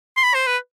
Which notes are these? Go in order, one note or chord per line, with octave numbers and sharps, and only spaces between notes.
C6
B5
C5
B4